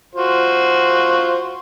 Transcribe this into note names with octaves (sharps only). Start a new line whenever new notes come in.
F4 F#4 C5